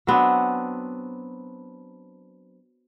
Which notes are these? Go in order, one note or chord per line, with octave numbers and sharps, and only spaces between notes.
F#3 B3 C4 D4